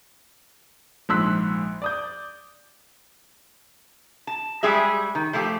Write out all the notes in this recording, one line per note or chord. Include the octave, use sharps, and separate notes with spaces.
A#1 G#2 C6 E6 F#6 B6
D5 D#6 G6
A5
G3 G#3 G#4 E5
D#3
F3 A3 F4 G4